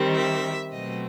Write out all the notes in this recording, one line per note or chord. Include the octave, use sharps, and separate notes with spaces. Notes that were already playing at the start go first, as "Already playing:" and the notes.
Already playing: D#3 G3 C4
E5
B2 F#3 A3 C4 D#5